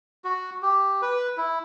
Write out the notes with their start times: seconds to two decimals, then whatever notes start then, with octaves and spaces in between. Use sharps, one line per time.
0.24 F#4
0.62 G4
1.02 B4
1.37 E4